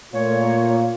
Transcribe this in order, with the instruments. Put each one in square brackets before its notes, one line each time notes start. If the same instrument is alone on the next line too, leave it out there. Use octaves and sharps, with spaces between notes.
[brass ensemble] A#2 [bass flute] A3 [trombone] F4 [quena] C#5